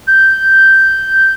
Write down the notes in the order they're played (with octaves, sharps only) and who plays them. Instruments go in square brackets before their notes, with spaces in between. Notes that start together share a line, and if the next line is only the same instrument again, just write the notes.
[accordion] G6